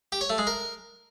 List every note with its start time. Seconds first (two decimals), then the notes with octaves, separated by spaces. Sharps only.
0.12 G4
0.21 C#5
0.30 A3
0.38 G#3
0.47 A#4